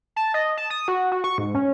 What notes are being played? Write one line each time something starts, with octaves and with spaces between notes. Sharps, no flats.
A5
D#5
A5
D#6
F#4
F#4
C#6
G#2
C#4